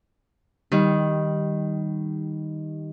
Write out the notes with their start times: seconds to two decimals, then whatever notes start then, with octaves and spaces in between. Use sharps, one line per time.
0.72 D#3 G3